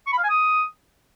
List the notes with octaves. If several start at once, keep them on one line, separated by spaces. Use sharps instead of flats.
C#6
B5
F5
G#5
D#6